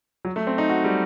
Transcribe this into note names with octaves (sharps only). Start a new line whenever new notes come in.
F#3
A3
C4
D#4
F#4
G3